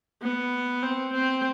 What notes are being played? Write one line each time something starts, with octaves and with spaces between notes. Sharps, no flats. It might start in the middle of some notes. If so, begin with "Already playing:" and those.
B3
C4
C4